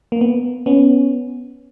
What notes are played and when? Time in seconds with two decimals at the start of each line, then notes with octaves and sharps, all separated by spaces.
0.12 A#3
0.21 B3
0.66 B3 C#4